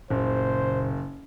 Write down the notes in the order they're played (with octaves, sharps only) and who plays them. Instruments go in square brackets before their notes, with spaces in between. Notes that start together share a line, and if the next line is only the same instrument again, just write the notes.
[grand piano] F#1 [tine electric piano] A#2 C#3 [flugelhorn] C5